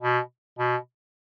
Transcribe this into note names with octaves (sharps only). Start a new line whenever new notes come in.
B2
B2